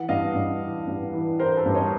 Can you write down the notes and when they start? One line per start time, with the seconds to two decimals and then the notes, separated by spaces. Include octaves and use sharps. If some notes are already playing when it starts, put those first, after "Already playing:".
Already playing: E3 F#5
0.09 G2 D#5 F5
0.35 G2
0.62 E3
0.87 G2
1.13 E3
1.39 E3 A#4 C5
1.57 A4 B4
1.66 G2
1.74 C#5 D#5